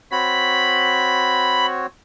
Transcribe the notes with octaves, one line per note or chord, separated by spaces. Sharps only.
C4 F#4 C#5 B5